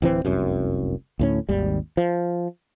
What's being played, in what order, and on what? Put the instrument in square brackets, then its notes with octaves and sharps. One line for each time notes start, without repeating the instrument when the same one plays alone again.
[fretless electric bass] D1 E3 C4
F1 C2 F#2
D2 A2 C#4
G#1 D#2 G3
F3